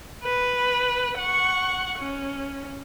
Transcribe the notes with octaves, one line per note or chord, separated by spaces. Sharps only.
B4
F#5 C#6
C#4